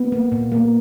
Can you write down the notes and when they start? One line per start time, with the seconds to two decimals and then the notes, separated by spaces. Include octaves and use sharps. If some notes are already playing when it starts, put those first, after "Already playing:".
Already playing: B3
0.12 A#3
0.32 A#2
0.52 A#3